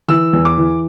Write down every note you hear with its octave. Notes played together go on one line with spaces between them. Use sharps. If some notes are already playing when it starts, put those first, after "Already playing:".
E3 E6
E2
D6
E3